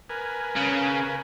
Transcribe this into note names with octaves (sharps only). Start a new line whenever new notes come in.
A#4 B4 G#5
C#3